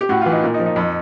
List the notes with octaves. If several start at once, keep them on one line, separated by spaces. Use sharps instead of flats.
G4
A2 F#4
E3 F4
D#4
A#2
D#4
F3
D#4
F2